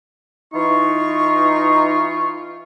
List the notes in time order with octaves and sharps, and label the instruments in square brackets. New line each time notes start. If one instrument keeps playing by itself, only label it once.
[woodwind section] E3 F4 C#6 [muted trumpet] D#4